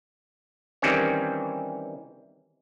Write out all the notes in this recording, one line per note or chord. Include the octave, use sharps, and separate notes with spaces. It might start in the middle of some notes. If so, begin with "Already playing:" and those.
D#3 E3 G3 C4 C#4 C#5